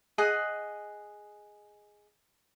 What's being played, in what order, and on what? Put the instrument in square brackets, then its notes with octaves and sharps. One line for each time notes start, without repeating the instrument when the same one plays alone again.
[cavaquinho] G#4 D#5 F#5 G#5